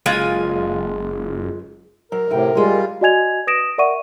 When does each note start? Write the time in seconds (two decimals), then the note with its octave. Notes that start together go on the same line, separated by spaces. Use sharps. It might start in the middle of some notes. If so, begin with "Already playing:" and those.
0.06 F#1 G#3 F4 G#5
2.12 F#3 A#4
2.30 D2 A2 C3 G5
2.55 F#2 G3 G#3 F4
3.01 F#4 D5 D#5 G#5 G#6 F7
3.47 B4 D#6 A#6 D7 E7
3.78 A#4 D5 E5 F#5 C#6 D#7